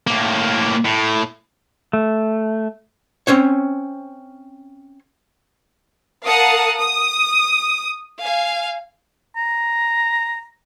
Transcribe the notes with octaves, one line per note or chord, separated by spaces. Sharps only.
A2 A#3
A2
A3
C4 C#4 C5 C#5
A#4 F5 F#5 A5 D#6
D#6
F5 G#5
A#5